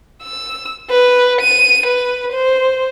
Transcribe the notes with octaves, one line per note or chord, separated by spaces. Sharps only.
E6
B4
D#7
B4
C5